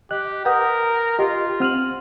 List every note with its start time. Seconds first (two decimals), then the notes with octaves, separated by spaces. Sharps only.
0.11 G4 D#5 F#6
0.45 A#4 B4 F#5 D#6 G6
1.19 F4 G4 D#5
1.60 C4 F#5 F6 D#7 F#7